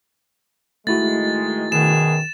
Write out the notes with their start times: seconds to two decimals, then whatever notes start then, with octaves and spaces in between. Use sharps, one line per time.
0.87 D#3 G#3 A3 E4 F#4 A6
1.72 F#2 B2 D#3 G#4 E7